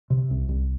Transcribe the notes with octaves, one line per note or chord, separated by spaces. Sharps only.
C3
C2
C2